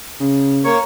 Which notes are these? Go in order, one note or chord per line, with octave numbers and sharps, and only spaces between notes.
C#3
A#3 C#5